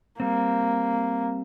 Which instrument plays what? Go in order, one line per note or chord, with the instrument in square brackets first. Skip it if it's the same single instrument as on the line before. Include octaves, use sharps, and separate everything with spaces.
[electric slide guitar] G3 C4 [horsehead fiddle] A#3